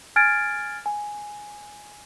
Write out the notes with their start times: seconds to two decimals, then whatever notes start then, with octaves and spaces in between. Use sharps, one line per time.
0.16 G#5 F6 G#6 A6 D7
0.86 G#5